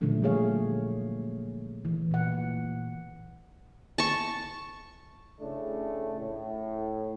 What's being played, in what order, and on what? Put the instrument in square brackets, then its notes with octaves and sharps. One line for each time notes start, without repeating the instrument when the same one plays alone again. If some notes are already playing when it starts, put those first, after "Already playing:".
[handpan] A#2 D3 F3 F#3 A3 D4
D3 G3 G#4 C#5 F5
E3
A#2 F#5
[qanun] A5 C#6
[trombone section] A2 C#3 A3 D4
A2